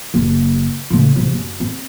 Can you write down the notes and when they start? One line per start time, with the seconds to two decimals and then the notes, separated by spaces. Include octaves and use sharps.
0.14 F#1
0.91 A2 C#3
1.16 C3 E3
1.33 F#2
1.60 C4